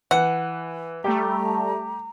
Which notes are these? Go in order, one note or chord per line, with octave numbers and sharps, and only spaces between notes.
E3 F#5
G3 A3 G4 A#5